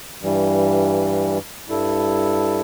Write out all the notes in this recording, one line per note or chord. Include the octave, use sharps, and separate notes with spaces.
G2 E3 G3
G2 G3 E4 A4